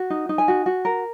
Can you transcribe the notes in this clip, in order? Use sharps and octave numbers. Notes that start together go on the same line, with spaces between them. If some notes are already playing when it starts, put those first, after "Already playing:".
Already playing: F#4
D#4
D#4
G#5
F#4
F#4
A#4